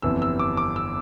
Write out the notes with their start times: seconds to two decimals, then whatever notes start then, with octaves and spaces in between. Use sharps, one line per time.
0.02 G1 F2 E3 E6
0.22 E6
0.39 D6
0.57 D6
0.76 E6